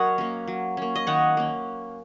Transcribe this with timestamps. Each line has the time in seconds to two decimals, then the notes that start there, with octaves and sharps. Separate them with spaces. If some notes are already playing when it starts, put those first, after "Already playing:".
Already playing: F#3 A#4 C#5 D#5 F#5
0.18 A#3 C#4
0.47 F#3
0.77 A#3 C#4
0.95 D#5
1.07 D#3 C#5 F#5
1.37 A#3 C#4